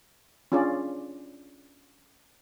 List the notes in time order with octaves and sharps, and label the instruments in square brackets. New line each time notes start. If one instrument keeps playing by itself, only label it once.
[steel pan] C#4 D4 F4 G#4 D5